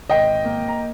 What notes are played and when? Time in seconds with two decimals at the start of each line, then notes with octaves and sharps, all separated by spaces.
0.10 G#1 D#5 G5
0.45 A#3
0.68 A#5